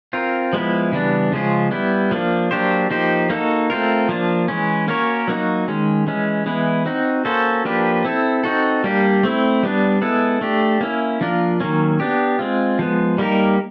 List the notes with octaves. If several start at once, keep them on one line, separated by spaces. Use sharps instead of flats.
C4 F4 A#4
F3 G#3 B3 E4
C#3 E3 G3 B3 D4
C#3 F3 G#3 C#4 F4
G3 B3 E4
F3 A#3 D4
F#3 A#3 D4 G4 C5
F3 A#3 D#4 G4 C5
A#3 D#4 F#4 A4
A3 C4 F4 A#4
F3 A#3 D4
E3 G#3 C#4
A#3 C#4 F#4 A#4 C#5
F#3 A#3 D#4 F#4
D#3 G#3 C#4
E3 G#3 C#4
E3 G#3 B3 E4
C4 D#4 F#4
A#3 C#4 F#4 A4 C5
F3 A#3 D4 G4 B4
C4 E4 A4
C4 D#4 F#4 A4
G3 A#3 D4 G4
A3 C4 E4
G3 B3 D4
G#3 B3 E4 A4
A3 D4 G4
A#3 C#4 E4
F3 A#3 D4 F4 A#4
D#3 F#3 A#3 C#4
B3 D4 G4
G#3 C4 F4
F3 G#3 B3
G3 A#3 D#4 G4 A#4